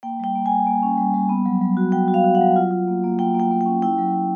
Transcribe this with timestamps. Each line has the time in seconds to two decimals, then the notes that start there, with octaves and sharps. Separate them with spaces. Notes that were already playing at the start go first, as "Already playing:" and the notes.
0.03 A#3 G5
0.20 G3 G5
0.35 A#3
0.46 G#5
0.51 G3
0.67 A#3
0.83 C#4
0.97 G3
1.14 G3
1.29 B3
1.46 F#3
1.61 F#3
1.77 F#4
1.92 F#3 G5
2.08 F#4
2.14 F5
2.24 F#4
2.35 F#5
2.41 F#3
2.56 F4
2.71 F4
2.87 A#3
3.04 A#3
3.19 A#3 G5
3.34 A#3
3.40 G5
3.51 A#3
3.61 G5
3.66 C#4
3.82 E4 G5
3.98 F#3
4.14 F#3